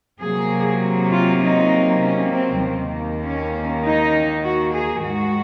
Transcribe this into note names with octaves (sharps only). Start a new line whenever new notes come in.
C3 F#3 A#3 G#4
F4
D#4
C#4
C4
D#2 D#3 A#3
C#4
D#4
F#4
G#4
G#2 D#3 G#3 F#4